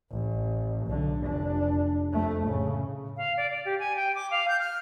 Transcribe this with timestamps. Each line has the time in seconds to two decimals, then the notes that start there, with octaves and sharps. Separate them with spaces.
0.11 A1
0.87 B1 D3
1.24 F1 D4
2.13 F2 A3
2.45 A2 C#3
3.17 F5
3.37 D5
3.51 D5
3.65 G4
3.79 G#5
3.96 G5
4.15 D6
4.30 F5
4.48 G6
4.59 F6